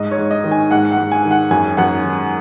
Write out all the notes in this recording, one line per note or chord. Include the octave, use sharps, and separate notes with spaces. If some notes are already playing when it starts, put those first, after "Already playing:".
Already playing: G#2 D#5
C#5
G#2
D#5
D#3
G#5
G#2 F#5
F#5
G#2
G#5
D#3
F#5
F#2 G#5
F#2 F#5
D#3